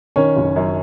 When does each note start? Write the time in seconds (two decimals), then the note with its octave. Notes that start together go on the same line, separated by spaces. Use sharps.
0.16 D#3 C#4 C#5
0.36 F#1
0.56 F#2